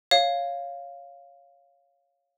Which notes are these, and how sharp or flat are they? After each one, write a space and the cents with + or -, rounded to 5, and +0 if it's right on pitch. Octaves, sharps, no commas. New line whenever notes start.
C#5 +0 F5 +0